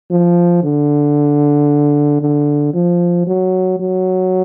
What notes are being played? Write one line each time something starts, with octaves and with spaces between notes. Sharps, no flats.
F3
D3
D3
F3
F#3
F#3